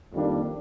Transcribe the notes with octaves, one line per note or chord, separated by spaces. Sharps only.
F2 D#3 G3 A#3 D4